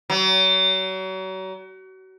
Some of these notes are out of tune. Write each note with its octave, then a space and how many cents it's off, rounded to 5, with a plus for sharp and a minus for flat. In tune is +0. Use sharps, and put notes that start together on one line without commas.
F#3 +35